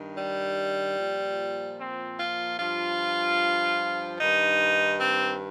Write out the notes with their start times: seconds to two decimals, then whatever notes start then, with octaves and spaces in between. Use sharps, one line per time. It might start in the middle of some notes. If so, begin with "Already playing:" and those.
Already playing: G2 D#3
0.17 G3
0.98 A#2 F3
1.78 C4
2.18 F4
2.59 G2 F3 F4
4.19 G2 D#3 D#4
5.00 C4